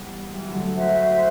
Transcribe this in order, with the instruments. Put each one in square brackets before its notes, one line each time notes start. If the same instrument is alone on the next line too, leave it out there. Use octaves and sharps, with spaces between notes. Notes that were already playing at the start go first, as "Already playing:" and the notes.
Already playing: [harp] E3 G3 B3
E3 G3
D3 F#3
F#3 A3
[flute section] F#4 C5 E5